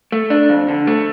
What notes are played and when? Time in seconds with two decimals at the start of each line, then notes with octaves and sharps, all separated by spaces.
0.12 A3
0.30 D4
0.49 F2
0.69 D3
0.87 A3